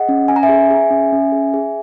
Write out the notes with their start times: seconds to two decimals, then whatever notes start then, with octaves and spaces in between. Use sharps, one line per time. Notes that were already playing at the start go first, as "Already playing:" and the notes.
Already playing: G#4 D#5 F#5
0.09 C#4
0.28 C#4 G#5
0.36 A#5
0.43 E5 G#5
0.49 G#4
0.71 G#4
0.91 C#4
1.12 C#4
1.32 G#4
1.54 G#4